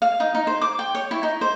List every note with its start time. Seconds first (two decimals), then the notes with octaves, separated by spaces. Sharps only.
0.02 F5
0.20 D#4
0.35 D#4
0.47 C5
0.61 D6
0.79 G5
0.95 C#5
1.11 E4
1.23 D#4
1.41 C5